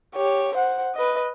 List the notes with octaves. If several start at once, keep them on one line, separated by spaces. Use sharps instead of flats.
G4 C#5
C5 F#5
B4 D#5